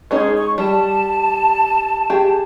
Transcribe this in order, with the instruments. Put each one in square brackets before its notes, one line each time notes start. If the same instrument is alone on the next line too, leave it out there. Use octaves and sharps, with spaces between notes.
[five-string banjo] G#3 C#4 D#4 [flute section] G#4
[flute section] C#6
[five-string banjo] G3 [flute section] A5
[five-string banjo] G4 G#4